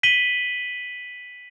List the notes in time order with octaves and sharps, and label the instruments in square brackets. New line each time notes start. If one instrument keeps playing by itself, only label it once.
[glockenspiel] B6 D#7 F#7 G7